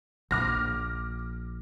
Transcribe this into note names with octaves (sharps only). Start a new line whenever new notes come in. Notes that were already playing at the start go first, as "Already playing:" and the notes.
A#1 D6 F6 A#6